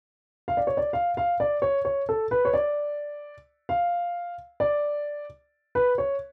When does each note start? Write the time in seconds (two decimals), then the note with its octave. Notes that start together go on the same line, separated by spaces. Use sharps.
0.48 F5
0.57 D5
0.67 C#5
0.77 D5
0.93 F5
1.17 F5
1.40 D5
1.62 C#5
1.85 C#5
2.09 A4
2.31 B4
2.45 C#5
2.54 D5
3.69 F5
4.60 D5
5.75 B4
5.98 C#5